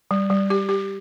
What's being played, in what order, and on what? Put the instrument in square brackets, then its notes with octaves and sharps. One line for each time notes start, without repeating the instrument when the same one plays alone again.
[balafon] G3
G3
G4
G4